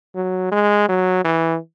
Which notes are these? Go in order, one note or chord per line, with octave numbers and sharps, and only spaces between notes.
F#3
G#3
F#3
E3